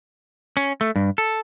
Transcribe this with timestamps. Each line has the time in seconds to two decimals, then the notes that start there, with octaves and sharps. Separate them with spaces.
0.57 C#4
0.81 A3
0.96 G2
1.18 A4